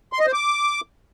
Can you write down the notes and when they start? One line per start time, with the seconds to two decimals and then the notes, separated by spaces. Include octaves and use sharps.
0.13 C6
0.19 D#5
0.26 C5
0.33 D6